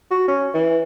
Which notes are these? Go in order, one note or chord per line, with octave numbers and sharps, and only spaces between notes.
F#4
C#4
E3